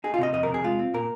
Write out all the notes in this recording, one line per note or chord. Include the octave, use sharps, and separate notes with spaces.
D#4 G#4
F4
C3 D#5
F2 D#5
A#4
C3
G#4
G#3 F4
C4
A#2 A#4